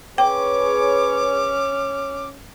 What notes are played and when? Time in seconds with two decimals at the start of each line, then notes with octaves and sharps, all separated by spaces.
0.18 C#4 G#4 B4 C#5 G5 D6